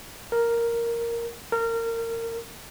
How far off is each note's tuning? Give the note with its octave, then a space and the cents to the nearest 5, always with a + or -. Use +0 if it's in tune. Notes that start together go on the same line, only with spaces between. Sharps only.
A#4 +0
A#4 -25